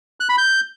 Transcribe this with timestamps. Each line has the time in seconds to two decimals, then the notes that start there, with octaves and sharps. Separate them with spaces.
0.20 F#6
0.29 B5
0.38 G6